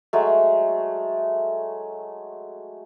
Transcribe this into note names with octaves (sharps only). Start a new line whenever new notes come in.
F#3 G#3 A3